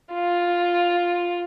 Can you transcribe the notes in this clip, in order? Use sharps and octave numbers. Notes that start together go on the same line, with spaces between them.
F4